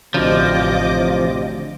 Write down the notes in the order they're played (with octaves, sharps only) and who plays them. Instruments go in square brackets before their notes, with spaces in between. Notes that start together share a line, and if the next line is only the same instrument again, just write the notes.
[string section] A1 D#5 D6 [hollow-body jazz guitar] D2 [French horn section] C3 [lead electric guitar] F3